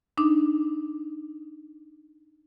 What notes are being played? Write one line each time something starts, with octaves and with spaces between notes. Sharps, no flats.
D4 D#4 D6